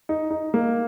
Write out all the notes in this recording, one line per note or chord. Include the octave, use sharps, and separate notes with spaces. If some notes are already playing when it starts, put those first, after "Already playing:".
D#4
D#4
A#3